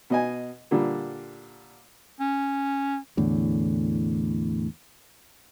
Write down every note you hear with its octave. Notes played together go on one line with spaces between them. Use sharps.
B2 D#5 G#5
A#2 D3 G3 D4
C#4
E2 A2 D3